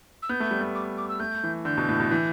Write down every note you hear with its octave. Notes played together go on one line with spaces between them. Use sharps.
E6
B3 G6
A3
G3
A3
D6
D6
E6
A3 G6
E3
D3 G6
B2
A2
B2
E3